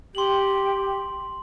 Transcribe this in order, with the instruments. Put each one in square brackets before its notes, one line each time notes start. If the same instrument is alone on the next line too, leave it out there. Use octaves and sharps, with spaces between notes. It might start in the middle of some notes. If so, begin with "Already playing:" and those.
[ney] G4 [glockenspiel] C6 F#7